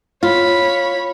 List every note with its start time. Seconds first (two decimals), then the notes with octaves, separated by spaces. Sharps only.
0.23 F4 C#5 B5